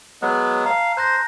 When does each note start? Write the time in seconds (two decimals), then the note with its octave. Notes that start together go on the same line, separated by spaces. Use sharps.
0.22 F#3 G#3 B3
0.66 F5 A5 A#5
0.97 C5 F#6 G6 A#6